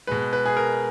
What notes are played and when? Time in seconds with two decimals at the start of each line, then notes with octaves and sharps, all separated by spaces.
0.07 B2 G#3 B4
0.33 B4
0.46 G#4
0.57 A#4